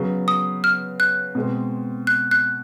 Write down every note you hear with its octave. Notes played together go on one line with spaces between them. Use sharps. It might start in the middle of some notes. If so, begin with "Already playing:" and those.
Already playing: C#3 F#3 B3
D#6
F6
F#6
B2 G#3 C4
F#6
F#6